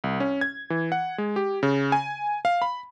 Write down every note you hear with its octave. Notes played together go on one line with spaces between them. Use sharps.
C2
C#4
G#6
E3
F#5
G#3
G4
C#3
G#5
F5
B5